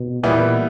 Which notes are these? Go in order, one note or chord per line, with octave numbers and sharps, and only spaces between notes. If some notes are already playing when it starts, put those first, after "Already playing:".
Already playing: B2
A#2 E3 G3 B3 E4